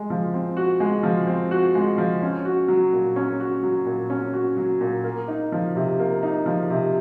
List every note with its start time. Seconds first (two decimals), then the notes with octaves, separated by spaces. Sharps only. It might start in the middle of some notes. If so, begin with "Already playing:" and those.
Already playing: G#3
0.10 F3
0.34 C4
0.57 F#4
0.80 G#3
1.03 F3
1.27 C4
1.51 F#4
1.75 G#3
1.98 F3
2.22 C#4
2.45 F#4
2.68 F#3
2.93 A#2
3.16 C#4
3.40 F#4
3.63 F#3
3.86 A#2
4.10 C#4
4.33 F#4
4.57 F#3
4.81 A#2
5.04 A#3
5.28 D#4
5.52 F3
5.76 C3
5.99 A#3
6.23 D#4
6.46 F3
6.70 C3